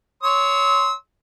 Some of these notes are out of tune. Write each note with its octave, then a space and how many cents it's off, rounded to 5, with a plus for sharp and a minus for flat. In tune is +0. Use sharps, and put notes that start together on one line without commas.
C#5 +15 C6 +0 E6 -35